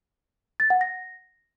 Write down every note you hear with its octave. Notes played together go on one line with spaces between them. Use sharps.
A6
F#5
A#6